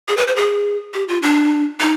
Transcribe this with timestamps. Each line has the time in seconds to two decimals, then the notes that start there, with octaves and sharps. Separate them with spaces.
0.08 G#4
0.17 B4
0.28 C5
0.36 G#4
0.94 G4
1.08 F4
1.22 D4
1.80 D#4